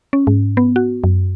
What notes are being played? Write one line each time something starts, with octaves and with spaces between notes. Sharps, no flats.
C#4
G#2
B3
F#4
F#2